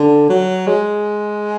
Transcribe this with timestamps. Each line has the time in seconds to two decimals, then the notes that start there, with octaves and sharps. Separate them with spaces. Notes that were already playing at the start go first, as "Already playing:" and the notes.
Already playing: D3
0.29 F#3
0.67 G#3